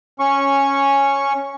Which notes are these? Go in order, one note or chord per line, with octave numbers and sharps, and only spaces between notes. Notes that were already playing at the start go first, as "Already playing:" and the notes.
C#4 C#6